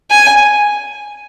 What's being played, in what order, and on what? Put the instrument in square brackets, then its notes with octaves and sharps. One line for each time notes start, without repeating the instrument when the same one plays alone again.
[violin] G#5